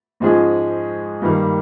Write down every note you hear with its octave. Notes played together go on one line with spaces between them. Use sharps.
G#2 F3 G#3 C#4 G#4
G2 D#3 G3 A#3